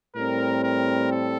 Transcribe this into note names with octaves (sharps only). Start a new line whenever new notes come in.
A2 G3 C4 A#4
A#4
A4